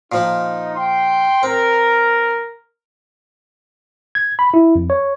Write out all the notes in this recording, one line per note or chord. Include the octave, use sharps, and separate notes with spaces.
A#2 F3 D#4
G5 C6
C4 A#4
G#6
B5
E4
F2
C#5